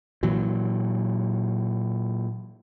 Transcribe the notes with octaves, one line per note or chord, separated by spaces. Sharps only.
A#2 E3 F#3